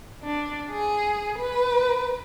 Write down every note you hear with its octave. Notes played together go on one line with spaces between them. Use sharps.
D4
G#4
B4